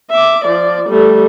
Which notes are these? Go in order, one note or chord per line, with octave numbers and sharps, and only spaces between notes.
E5 D6
F3 D5
G3 A3